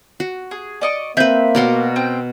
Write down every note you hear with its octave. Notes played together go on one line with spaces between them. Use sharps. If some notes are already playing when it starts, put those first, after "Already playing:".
F#4
G#4
D5 D#5 C#6
A#3 C4 B4 E5 G6
B2 F#4 A#4 D5 C6
C4 G5